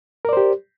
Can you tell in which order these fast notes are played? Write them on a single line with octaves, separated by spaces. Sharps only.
A#4 D5 C5 G4